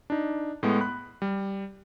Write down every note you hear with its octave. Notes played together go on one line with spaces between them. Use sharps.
D4 D#4
A2 G#3 A3 B3
B5 F#6
G3